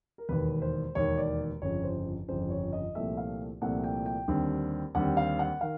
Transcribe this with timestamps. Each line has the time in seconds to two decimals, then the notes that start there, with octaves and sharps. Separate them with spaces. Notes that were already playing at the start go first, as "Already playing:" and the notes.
0.18 A#4
0.29 E1 D#2 D#3 B4
0.62 C5
0.95 E1 D#2 D#3 C#5
1.18 D5
1.62 G1 F2 C#3 C#5
1.84 C5
2.28 G1 F2 C#3 C5
2.50 C#5
2.73 D#5
2.95 C2 A#2 F3 A3 C4 E5
3.17 F5
3.61 C2 A#2 F3 A3 C4 F#5
3.84 G5
4.06 G5
4.28 D#2 D3 G3 C4
4.95 D#2 D3 G3 C4 F#5
5.17 F5
5.39 F#5
5.61 D#3 F5